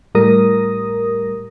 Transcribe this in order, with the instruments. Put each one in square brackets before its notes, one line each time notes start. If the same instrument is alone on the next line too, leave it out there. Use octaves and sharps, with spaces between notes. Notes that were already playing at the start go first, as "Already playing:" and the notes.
[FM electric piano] A2 G3 A#4 D#6 A#6